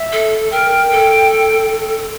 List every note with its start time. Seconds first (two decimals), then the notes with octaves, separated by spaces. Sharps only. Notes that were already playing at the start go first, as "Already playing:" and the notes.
Already playing: E5
0.12 A4
0.52 A#4 G5
0.91 A4